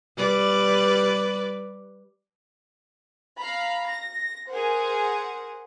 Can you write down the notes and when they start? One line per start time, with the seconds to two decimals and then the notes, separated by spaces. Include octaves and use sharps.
0.17 G3 B4 D5
3.40 F5 A#5 B5
3.89 A#6
4.48 G#4 A#4 C5 F#5